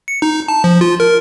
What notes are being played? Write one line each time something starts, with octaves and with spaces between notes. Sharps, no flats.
C#7
D#4
A5
F3
F4
A#4